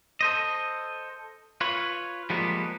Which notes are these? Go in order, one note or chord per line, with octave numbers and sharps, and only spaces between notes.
A4 C5 D#5
F4 B4 C#5
F3 G3 G#3 A#3 B3